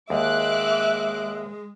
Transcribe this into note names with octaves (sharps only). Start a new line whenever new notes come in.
D#2 G#3 E5 D6 F#6